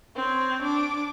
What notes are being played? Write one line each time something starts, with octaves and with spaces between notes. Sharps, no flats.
C4 C#5
D4 D6